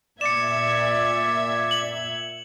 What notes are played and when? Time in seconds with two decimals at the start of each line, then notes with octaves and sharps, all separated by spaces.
0.21 A#2 D5 E5 G#6 C#7 E7
1.71 F#7